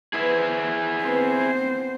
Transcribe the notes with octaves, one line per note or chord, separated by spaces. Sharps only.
B3 E4 G#4 C5
B3 C4 C5 C6